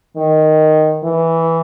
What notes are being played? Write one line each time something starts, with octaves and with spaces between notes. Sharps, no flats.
D#3
E3